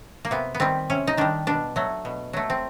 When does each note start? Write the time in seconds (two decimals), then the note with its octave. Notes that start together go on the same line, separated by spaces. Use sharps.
0.25 A#3
0.31 C3 B3
0.55 B3
0.60 D#3 G3 C4
0.90 C3 C#4
1.07 D#4
1.17 D#3 G3 D4
1.47 B2 D4
1.76 F#3 A3
2.05 B2
2.33 F#3 A3
2.50 C4